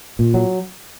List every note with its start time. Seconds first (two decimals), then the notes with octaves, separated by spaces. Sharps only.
0.19 A#2
0.34 F#3